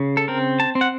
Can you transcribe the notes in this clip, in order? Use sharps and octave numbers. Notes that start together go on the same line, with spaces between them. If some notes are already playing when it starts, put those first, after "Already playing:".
Already playing: C#3
A4
C4 A#4
A5
C4
F#5